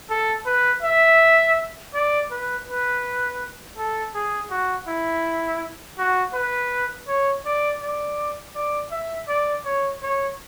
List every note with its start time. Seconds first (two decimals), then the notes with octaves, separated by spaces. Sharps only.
0.10 A4
0.46 B4
0.83 E5
1.94 D5
2.31 B4
2.68 B4
3.78 A4
4.15 G#4
4.50 F#4
4.88 E4
5.98 F#4
6.34 B4
7.08 C#5
7.46 D5
7.82 D5
8.55 D5
8.91 E5
9.28 D5
9.65 C#5
10.02 C#5